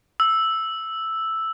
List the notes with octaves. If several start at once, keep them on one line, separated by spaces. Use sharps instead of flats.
E6